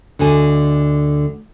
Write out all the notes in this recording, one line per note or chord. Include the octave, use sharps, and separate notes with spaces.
D2 D3 D#5 G#5